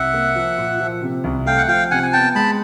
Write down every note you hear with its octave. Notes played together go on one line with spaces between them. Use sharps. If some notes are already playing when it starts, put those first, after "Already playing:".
Already playing: C2 E5 F#5
A#3
F3
A#2
F3
C3
C2
A3 F5 G5
F#5
F3 F5 G5
C3 F#5 G#5
G#5
B3 G5 A5
G#3 A5 B5